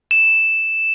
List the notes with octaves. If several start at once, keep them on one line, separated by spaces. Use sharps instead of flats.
E7